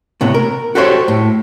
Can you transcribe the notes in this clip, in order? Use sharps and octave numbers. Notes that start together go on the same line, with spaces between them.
A2 C3 B3
A#4
F#4 G4 A4 C5 C#5
A2